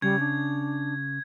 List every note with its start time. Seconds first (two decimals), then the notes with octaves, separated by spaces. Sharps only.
0.02 C#3 G3 G#6
0.20 D4